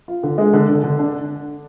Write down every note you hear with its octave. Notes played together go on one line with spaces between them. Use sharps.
F4
D3
G#3
D3
D3
D3
D4